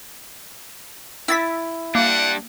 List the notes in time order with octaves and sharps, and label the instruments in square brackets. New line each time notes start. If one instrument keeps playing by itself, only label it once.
[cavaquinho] E4 [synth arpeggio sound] E6 A6 B6
[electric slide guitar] G3 D4 [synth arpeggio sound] A#3 [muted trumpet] F#5